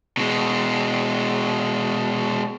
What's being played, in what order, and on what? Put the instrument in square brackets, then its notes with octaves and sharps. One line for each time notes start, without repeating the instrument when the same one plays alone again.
[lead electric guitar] B2 G#3